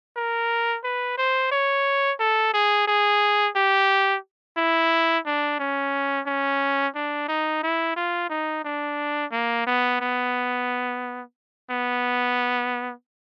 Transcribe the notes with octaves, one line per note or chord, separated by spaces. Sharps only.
A#4
B4
C5
C#5
A4
G#4
G#4
G4
E4
D4
C#4
C#4
D4
D#4
E4
F4
D#4
D4
A#3
B3
B3
B3